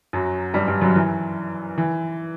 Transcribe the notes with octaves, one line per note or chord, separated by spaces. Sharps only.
F#2 F#3
G2 G3
G2 G3
F#2 F#3
E3
E3